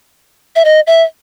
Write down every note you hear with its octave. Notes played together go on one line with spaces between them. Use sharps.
E5
D#5
E5